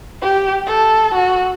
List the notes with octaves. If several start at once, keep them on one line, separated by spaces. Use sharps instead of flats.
G4
A4
F#4